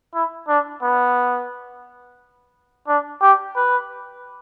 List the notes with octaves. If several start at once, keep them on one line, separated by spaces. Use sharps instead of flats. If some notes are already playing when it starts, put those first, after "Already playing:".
E4
D4
B3
D4
G4
B4